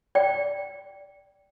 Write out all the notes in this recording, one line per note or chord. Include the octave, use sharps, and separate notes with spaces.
D5 G5